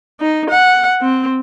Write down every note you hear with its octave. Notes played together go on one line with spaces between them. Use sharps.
D#4
F#5
C4